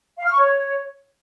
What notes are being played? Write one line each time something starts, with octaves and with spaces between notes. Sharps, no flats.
F5
F6
C#6
C#5